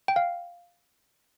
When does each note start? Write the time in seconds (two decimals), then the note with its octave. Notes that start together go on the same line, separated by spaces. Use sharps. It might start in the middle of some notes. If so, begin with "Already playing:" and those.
0.08 G5
0.16 F5